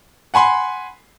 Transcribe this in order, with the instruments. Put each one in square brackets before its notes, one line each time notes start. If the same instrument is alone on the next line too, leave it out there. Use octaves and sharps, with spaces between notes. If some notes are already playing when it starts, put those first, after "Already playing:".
[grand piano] F#5 G#5 B5 C6